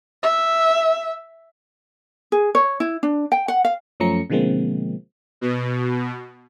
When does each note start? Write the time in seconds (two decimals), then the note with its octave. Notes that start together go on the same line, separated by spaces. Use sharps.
0.23 E5
2.32 G#4
2.55 C#5
2.80 E4
3.03 D4
3.32 G5
3.48 F#5
3.65 F5
4.00 F#2 F3 A3 C#4 A#5 C#7
4.30 B2 D3 F3 G#3 A#3 C4
5.41 B2